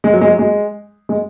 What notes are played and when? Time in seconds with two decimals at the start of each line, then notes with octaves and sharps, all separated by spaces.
0.04 G#3
0.13 F#3
0.21 G#3
0.30 F#3
0.39 G#3
1.09 G#3